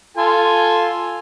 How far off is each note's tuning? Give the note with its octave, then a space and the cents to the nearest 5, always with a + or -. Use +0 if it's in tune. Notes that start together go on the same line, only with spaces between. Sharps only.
F4 +0 A4 +0 G#5 +0